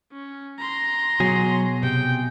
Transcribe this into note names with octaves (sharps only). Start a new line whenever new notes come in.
C#4
A#5 C6
B2 F#3 G#4
C3 G5